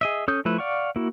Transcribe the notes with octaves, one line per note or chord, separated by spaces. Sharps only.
G#4 D#5 E5
C#4 A4 D#6 G6
F3 A3 E4 B4 E5
D5 F5 F#5 C#6
A#3 E4 F#4